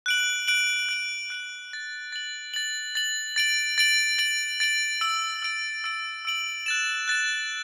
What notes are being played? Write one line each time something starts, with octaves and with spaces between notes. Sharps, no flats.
F#6 D7 F#7
F#6 D7 F#7
F#6 D7 F#7
F#6 D7 F#7
A6 F#7
A6 F#7
A6 F#7
A6 F#7
A6 D7 F#7
A6 D7 F#7
A6 D7 F#7
A6 D7 F#7
E6 D7 F#7
E6 D7 F#7
E6 D7 F#7
E6 D7 F#7
F#6 A6 E7
F#6 A6 E7